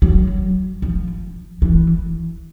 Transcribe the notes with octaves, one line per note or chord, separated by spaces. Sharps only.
F#3
F3
E3